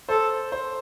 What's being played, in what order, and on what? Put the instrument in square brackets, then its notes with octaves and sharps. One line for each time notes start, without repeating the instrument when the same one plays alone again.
[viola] A4 [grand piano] C5
[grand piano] C5